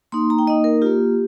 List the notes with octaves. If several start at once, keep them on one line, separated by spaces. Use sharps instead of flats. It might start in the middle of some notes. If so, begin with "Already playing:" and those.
A#3 D#4 C6
A#5
G5
A#3 D#4 D#5
A#4
A#3 F4 G4